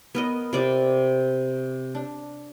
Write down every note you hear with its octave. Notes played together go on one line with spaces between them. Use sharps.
B3 A#4 D#5
C3 D5 D6
D4